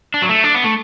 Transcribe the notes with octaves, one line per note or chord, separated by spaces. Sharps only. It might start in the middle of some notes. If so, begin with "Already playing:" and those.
D4
F#3
A3
D4
B3
A3